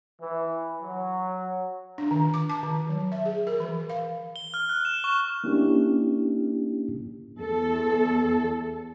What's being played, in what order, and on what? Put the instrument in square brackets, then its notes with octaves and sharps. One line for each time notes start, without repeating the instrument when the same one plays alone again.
[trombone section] E3
F#3
[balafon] D4
D#3
D6
A5
D#3
F#3
E5
G#4
A#4
E3
F5
[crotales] G7
F6
F#6
E7
C#6
[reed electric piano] A#3 C#4 D4 E4 G4
[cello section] E2 A4